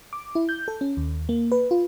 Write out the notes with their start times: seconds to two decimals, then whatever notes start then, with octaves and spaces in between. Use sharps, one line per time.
0.13 D6
0.35 E4
0.49 G6
0.68 A4
0.81 C#4
0.97 D#2
1.29 A#3
1.52 B4
1.71 F4